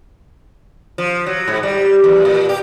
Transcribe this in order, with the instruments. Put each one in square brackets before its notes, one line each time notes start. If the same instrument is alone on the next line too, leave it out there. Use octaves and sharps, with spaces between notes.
[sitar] F3
F#3
G#2
G3
E2
A#2
G4